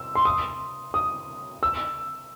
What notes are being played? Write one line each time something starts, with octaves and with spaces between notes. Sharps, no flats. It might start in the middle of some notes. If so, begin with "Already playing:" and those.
Already playing: E6
C6
D#6
D#6
E6